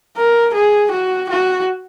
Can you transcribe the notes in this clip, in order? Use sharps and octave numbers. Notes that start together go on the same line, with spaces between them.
A#4
G#4
F#4
F#4